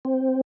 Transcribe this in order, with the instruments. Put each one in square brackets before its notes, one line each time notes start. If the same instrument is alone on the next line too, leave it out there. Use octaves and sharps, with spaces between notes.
[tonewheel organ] C4